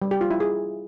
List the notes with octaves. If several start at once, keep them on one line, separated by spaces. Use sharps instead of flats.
G3
G4
F4
E4
G#4